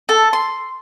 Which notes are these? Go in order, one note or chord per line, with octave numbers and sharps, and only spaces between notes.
A4
C6